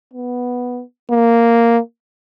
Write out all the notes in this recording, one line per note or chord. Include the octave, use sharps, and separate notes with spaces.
B3
A#3